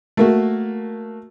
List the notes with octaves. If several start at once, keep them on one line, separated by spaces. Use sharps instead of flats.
A3 A#3 F#4